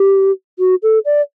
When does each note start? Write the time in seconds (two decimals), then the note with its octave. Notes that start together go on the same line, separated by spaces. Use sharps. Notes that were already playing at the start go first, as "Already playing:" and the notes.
Already playing: G4
0.59 F#4
0.83 A4
1.05 D5